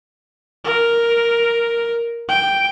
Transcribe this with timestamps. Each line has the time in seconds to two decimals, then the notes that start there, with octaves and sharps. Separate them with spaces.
0.65 A#4
2.29 G5